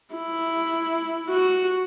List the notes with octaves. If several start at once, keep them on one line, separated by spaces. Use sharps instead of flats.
E4
F#4